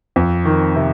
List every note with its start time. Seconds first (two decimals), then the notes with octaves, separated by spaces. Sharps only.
0.16 F2
0.45 D#3
0.76 C3